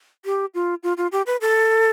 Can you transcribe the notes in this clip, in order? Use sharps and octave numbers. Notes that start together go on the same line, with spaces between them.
G4
F4
F4
F4
G4
B4
A4